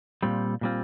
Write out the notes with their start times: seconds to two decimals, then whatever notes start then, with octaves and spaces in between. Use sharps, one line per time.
0.23 A#2 G3 C4 F4
0.61 A#2 G3 C4 F4